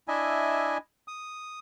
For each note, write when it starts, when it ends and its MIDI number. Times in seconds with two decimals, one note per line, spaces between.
0.08 0.78 62
0.08 0.78 64
0.08 0.78 75
0.08 0.78 76
0.08 0.78 80
1.08 1.59 87